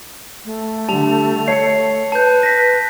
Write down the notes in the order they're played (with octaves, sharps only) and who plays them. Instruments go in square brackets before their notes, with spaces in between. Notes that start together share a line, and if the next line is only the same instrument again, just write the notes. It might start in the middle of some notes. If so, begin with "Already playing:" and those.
[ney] A3
[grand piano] D3 G3 [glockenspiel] A5 F7
[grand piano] C#5 [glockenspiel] C7 C#7
[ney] B4 [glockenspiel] A5 G6
[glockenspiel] A#6 B6